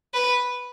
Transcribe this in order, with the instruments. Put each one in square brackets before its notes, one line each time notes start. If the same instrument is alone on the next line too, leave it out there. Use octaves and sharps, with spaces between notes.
[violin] B4